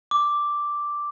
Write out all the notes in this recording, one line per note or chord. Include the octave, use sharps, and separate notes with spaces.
D6